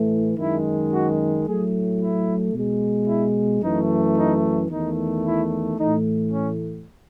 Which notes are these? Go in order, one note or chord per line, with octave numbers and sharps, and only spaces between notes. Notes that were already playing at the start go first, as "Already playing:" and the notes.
Already playing: A2 E3 A3
F#2 D#3 G#3 E4
F#4
A2 F#3 A3 G#4
E4
B2 G#3
E4
F#2 E3 A3 D#4
D#4
E2 D#3 A3 D#4
E4
A2 E3 A3 D#4
C#4